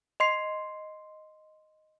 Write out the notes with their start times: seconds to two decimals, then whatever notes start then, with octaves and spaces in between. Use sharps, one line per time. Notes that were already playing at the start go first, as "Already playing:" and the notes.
0.20 D#5 C6 C7